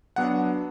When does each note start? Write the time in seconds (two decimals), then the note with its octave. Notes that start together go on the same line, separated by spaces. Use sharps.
0.16 F#3 B3 D4 F#5